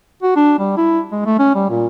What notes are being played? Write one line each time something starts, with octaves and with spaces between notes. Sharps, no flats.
F#4
D4
G3
E4
G#3
A3
C#4
G3
A#2